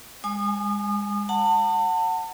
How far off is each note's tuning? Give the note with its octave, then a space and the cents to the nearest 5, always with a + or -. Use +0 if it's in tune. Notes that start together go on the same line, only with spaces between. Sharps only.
G#3 -30 G#5 +15 D#6 -35
F#5 -5 A5 +35